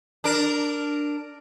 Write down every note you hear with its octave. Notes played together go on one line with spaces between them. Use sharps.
D4 A#4